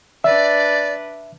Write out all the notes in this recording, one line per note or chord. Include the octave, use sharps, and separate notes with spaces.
D4 B4 D5 E5